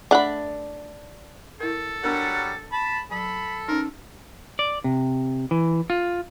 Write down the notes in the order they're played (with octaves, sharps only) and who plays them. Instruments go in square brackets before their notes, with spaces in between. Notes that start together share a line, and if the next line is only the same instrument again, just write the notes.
[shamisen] A3 F#5 [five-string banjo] D4 B5
[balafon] E4 A#4 [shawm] A4
[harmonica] F#3 G3 F#5 [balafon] B3 D4 A#4
[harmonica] A5 B5
[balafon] F#3 [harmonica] A4 [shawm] B5
[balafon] C#4 D#4 [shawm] A#4
[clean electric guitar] D5
C3
E3
F4